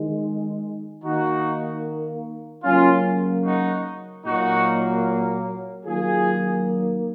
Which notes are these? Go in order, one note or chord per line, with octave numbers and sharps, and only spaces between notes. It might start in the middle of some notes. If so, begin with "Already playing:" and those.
Already playing: D#3 G#3
D#3 A#3 D#4 F#4
C#3 F#3 A#3 C#4 F4
D#4 F#4
A#2 F#3 A#3 D#4 F#4
D#3 F#3 A#3 F4 G#4